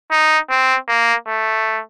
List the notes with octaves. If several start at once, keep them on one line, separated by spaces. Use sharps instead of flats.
D#4
C4
A#3
A3